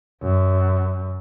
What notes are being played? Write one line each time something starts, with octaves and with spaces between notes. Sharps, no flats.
F#2